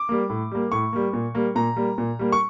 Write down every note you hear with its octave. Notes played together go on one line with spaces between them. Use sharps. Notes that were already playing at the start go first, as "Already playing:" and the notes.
Already playing: D6
G3 A#3
A2
G3 A#3
A2 C#6
G3 A#3
A#2
G3 A#3
A#2 A#5
G3 A#3
A#2
G3 A#3
C#6